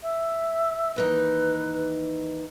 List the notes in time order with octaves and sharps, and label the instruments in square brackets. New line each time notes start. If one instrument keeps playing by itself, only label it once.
[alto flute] E5
[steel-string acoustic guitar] D#2 E3 D#4 [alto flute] B4